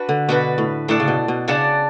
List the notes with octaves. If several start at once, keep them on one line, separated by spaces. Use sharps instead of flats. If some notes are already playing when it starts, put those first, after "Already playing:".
Already playing: D4 F#4 B4
D3
B2 D4 F#4 B4
A2
A2 D4 A4 D5 F#5
C#3
B2
B2
C#3 D4 A4 D5 F#5